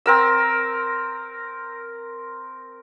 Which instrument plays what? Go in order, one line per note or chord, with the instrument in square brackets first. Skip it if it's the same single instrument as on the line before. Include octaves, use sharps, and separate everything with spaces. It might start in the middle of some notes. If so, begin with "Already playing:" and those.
[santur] C4 A#4 E6